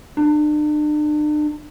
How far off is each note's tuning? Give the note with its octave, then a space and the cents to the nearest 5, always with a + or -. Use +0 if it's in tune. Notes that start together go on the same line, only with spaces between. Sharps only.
D4 +40